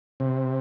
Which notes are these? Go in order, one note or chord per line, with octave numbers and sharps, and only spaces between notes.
C3